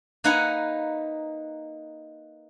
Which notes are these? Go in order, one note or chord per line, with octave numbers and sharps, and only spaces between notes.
A#3 D#4 B4 F#5 G#5 A#5